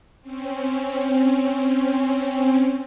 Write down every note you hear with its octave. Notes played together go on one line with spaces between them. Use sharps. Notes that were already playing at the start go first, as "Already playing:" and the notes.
C4 C#4